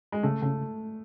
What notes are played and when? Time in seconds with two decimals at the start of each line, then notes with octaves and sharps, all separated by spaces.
0.12 G#3
0.23 C#3 A3
0.42 C#3 A3